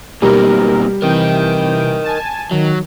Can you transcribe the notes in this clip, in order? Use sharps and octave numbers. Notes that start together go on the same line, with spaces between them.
B2 G3 A#3 C4 D#4 A#4
C3 E3 A#4 D#5 G5
G#5 A5
D#3 F#3